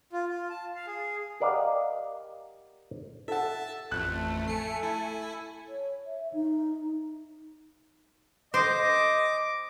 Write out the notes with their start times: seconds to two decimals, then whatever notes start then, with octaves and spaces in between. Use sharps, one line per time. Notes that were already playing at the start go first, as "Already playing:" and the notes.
0.13 F4
0.28 F4
0.50 A5
0.75 F5
0.87 G#4
1.40 G4 A#4 D5 D#5 F5 F#5
3.28 A4 E5 F#5 A5
3.91 A1 F2 A3 F#6
4.48 A4 G#5 C7 C#7
4.83 E4
5.69 C#5
6.06 E5
6.33 D#4
8.54 C5 D#5 D6